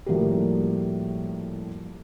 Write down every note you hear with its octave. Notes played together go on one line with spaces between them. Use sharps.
A2 F3 G3 A#3 F#4 G4